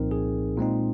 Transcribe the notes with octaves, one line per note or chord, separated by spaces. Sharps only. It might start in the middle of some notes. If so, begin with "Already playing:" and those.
Already playing: C2 A#2 F3 C4 D#4 A#4
G#4
A#2 G#3 C4 D#4